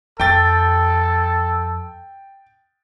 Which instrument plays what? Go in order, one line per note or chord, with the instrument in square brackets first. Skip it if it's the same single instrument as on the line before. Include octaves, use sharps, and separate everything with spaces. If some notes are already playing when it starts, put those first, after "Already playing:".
[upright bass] F2 [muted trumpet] A4 [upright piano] G5 A6